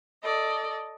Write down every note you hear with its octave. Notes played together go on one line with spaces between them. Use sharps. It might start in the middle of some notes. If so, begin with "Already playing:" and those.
A4 D5 D#5